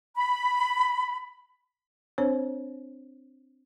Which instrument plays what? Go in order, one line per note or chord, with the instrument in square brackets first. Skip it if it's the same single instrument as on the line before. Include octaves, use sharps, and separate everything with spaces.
[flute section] B5
[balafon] C4 D4 C5 C#5